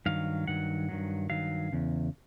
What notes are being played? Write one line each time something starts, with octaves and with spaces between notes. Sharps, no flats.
G2 D#3 F#3 F5
G2 D#3 F#3 F#5
G2 D#3 F#3
G2 D#3 F#3 F5
E2 C#3